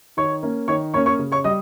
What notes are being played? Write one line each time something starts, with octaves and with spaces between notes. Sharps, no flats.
D#3 C#5 C#6
A#3 C#4
D#3 C#5 C#6
A#3 C#4 C#5 C#6
C#5 C#6
C#3
C#5 C#6
G3 D#5 D#6